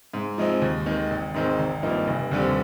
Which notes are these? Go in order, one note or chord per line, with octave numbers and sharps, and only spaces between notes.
G#2
F3 G#3 C4 D#4
D#2
D#3 G#3
G#1
G#2 D#3 G#3 C4
G#1
G2 F3 A#3 D#4
F1
D#2 D3 G3 C4